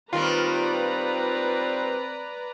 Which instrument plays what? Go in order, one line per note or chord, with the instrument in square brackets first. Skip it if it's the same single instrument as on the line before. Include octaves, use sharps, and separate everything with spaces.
[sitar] D#3 G3 A#3 [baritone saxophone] C4 [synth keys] F4 [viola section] B4 D5 A#5